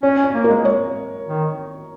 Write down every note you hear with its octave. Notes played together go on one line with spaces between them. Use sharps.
C#4 C#5
C#4
C#5
A#3
G#3 A#4
C#5
D#3